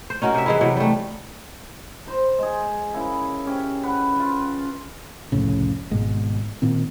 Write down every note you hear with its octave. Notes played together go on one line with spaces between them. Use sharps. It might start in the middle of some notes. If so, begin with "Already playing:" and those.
C5
C#4 D#4 F#4 A#4
C3 E5
E3 G#3 E4
C3 E3 F#3
G3 A3
C5 A#5
G#3 G#4
C#3 E4 A#4
C#4 G4
B4 F#5
F4
C2 F2 A2 C#3
G#1 G#2 B2 G#3
A#2 D#3 C4